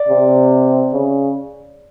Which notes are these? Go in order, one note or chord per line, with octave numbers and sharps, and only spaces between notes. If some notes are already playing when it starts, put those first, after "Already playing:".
Already playing: D5
C3
C#3